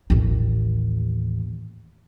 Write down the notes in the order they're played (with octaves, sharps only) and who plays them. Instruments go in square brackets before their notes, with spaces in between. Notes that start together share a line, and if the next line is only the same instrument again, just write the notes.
[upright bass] A1 D#2